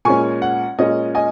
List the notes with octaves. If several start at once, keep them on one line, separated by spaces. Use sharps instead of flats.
A#2 G#3 C#4 G#5 C#6
F#5
A#2 G#3 C#4 D#5
D#5 G#5